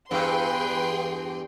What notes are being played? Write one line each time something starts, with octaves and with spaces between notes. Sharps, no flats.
E2 G2 G#4 B4 G5 C6